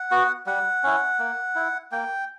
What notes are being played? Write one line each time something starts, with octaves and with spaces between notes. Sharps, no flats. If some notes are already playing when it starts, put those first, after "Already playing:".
Already playing: F#5
B3 F#4
G3 F#5
C#4 E4
A#3
E4
A#3 G5